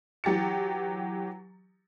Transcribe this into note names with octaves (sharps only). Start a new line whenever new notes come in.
E3 F#3 G4 A6 C#7